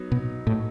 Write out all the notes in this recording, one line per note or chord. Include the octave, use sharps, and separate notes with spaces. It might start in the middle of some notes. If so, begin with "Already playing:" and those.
Already playing: F#3 B3 D#4
B2
A2